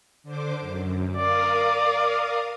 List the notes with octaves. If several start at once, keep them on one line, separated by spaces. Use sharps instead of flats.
D3 C5 D6
F#2
A#4 D5 F5 D#6